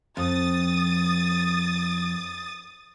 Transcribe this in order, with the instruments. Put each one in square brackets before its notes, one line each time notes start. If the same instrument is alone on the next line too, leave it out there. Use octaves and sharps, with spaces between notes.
[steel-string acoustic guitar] F2 [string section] D#6 A6